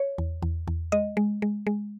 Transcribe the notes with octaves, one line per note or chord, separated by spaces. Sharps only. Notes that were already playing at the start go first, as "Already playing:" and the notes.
Already playing: C#5
E2
E2
E2
G#3 D#5
G#3
G#3
G#3